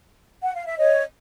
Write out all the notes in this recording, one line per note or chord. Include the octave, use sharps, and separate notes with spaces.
F#5
F5
E5
C#5 D#5